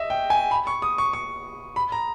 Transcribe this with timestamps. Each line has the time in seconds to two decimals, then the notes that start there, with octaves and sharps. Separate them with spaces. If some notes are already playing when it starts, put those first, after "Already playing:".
Already playing: D#5 E5
0.10 G5
0.30 G#5
0.51 B5
0.67 C#6
0.82 D#6
0.98 C#6
1.13 C#6
1.76 B5
1.92 A#5